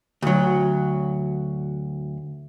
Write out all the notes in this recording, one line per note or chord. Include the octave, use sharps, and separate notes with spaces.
D2 F#3